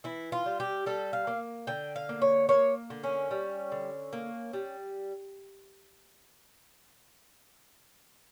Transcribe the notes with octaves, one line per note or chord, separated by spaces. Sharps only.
E3 E4
F4
G3
G4
G3 A4
F5
A#3
D3 G5
F5
A#3
C#5
A#3 C#5
D3
C#4
G3
D3
A#3
G3